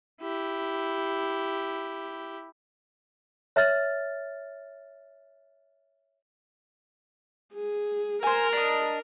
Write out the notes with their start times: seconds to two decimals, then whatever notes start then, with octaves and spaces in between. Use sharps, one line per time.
0.21 E4 G4
3.56 C#5 E5 F6 A6
7.54 G#4
8.23 A#4 C5 G#5
8.53 D4 D#5